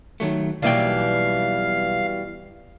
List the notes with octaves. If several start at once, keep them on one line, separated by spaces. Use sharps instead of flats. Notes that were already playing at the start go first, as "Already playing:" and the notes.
D#3 F#3 A3
B1 B2 E3 G3 A#3 F5 G5